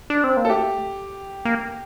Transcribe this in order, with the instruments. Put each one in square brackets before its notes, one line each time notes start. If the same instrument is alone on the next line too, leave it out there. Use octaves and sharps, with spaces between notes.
[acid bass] D4
C4
A#3
[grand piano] A4
[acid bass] A3 [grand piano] G4
[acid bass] A#3